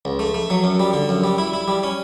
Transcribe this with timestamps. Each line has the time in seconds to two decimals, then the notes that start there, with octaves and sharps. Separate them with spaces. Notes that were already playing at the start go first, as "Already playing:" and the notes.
0.05 C#2
0.19 A3
0.34 A3
0.50 F#3
0.64 F#2
0.80 G3
0.93 D3
1.09 F#2
1.24 G3
1.38 E4
1.53 E4
1.68 G3
1.83 C#4